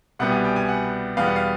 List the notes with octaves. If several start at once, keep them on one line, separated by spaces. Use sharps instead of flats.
C2 B2 G3 B3 F#5
G#5
G5
G#5
F#5
E2 B2 G3 B3 F5
F#5
F5